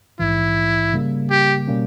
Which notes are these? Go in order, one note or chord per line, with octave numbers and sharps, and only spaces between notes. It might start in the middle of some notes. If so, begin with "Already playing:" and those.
A#1 G#2 E3 E4
C#3 G3 A#3
G4
B2 G3 A#3 C#4